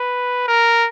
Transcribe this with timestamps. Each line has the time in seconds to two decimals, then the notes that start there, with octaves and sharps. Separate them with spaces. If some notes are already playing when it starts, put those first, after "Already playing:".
Already playing: B4
0.48 A#4